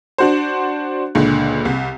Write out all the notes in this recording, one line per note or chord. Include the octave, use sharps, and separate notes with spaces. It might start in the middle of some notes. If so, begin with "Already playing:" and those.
D4 F#4 C5
C#2 A#2 D3
C2